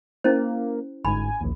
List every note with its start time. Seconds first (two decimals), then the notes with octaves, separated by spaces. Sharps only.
0.24 A#3 C#4 E4 C5
1.05 G1 G#2 G#5 B5
1.41 A#1 D#2